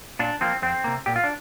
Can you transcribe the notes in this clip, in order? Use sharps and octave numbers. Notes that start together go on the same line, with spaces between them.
A#2 D4
F3 A#3 C4
F2 C4
C3 A#3
A#2 G4
F4
D4